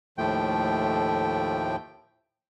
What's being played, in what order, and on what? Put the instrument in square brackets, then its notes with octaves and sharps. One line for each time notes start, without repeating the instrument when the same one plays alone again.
[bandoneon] D#2 A2 F3 A3 G5